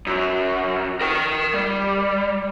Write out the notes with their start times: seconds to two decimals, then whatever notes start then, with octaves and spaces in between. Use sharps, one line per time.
0.07 F#2
1.01 A#4 G5
1.54 G3